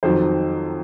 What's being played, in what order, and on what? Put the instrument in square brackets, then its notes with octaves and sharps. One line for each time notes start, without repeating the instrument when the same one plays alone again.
[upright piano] F2 D#3 F#3 C5